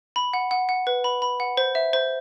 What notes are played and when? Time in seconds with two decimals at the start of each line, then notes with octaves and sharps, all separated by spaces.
0.16 B5
0.33 F#5
0.51 F#5
0.69 F#5
0.87 B4
1.04 B5
1.22 B5
1.40 F#5
1.57 C5
1.75 E5
1.93 C5